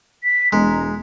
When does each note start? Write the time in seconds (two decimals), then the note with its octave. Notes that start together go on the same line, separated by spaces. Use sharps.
0.24 B6
0.53 E1 G#3 A#5